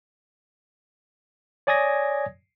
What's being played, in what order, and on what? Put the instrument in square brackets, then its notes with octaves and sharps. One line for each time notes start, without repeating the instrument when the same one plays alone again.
[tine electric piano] C#5 D5 G#5 D#6 G#6 A#6